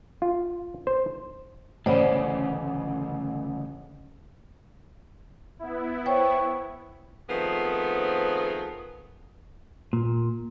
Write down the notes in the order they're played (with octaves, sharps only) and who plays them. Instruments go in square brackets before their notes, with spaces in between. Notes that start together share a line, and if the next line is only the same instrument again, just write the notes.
[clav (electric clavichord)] F4
C5
[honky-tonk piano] A1 [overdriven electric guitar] D2 C#3 [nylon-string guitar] E3 B3 [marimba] C5 D5 B5
[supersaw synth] B3 E4
[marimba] C5 C#5 G5 [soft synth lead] C#6
[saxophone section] D#3 F3 A3 B3 C4 G#4
[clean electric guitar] A#2